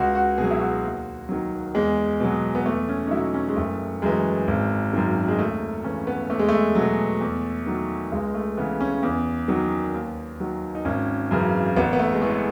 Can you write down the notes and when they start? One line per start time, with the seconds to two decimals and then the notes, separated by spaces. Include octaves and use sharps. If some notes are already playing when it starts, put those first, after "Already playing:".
Already playing: C#2 F#4
0.15 F#4
0.38 B2 F#3 G#4
0.51 E4
0.60 F#4
0.83 D#2
1.29 D#3 F#3
1.75 E2 G#3
2.20 B2 F#3
2.55 B3
2.66 E2 A3
2.89 C#4
3.07 D#4
3.11 B2 F#3 E4
3.34 C#4
3.49 G#3
3.57 F#1 A3
4.02 F#2 E3 G#3
4.48 G#1
4.93 F#2 D#3
5.28 G#3
5.39 D#2 A3
5.84 C#3 E3 C#4
6.07 B3
6.30 E2 A3
6.39 G#3
6.49 A3
6.75 B2 F#3
7.21 E2
7.66 D#3 F#3
8.12 C#2 G#3
8.35 A3
8.57 C#3 E3 B3
8.81 C#4
9.03 E2
9.48 D#3 F#3
9.94 D#2
10.40 D#3 F#3
10.75 D#4
10.85 G#1 C#4
11.31 F#2 C#3 E3
11.76 A1 B3
11.93 B3
11.99 A3
12.13 G#3
12.22 A2 E3 A3